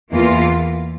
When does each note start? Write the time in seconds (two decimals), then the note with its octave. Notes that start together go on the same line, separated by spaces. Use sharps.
0.11 E2 E3 A#3 F4